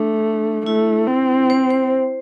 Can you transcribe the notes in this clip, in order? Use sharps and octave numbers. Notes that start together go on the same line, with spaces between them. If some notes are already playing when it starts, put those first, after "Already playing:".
Already playing: A3 D4
A3 E4
C4
C5
C5